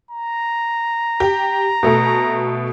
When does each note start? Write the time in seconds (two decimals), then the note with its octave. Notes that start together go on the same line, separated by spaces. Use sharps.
0.11 A#5
1.20 G4
1.83 B2 A3 A4